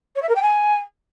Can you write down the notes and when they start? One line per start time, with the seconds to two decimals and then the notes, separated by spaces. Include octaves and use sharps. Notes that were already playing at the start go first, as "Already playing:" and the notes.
0.15 C#5
0.22 E5
0.29 A#4
0.35 G5
0.42 G#5